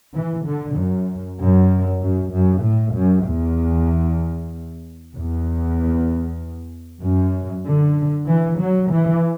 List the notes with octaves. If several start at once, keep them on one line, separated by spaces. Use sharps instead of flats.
E3
D3
F#2
F#2
F#2
F#2
A2
F#2
E2
E2
F#2
D3
E3
F#3
E3